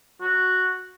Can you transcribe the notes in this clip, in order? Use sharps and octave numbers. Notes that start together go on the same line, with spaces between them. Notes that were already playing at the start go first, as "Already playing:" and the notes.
F#4